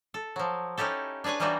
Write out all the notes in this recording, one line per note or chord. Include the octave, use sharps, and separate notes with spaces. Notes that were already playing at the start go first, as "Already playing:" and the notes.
A4
F3 F#3
C#4 D#4 E4 G4 A4
D4 G#4 B4 C#5 G#5
E3 G3 A#3 D4 D#4 F#4